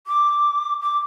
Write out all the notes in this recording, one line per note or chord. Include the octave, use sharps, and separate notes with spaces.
D6
D6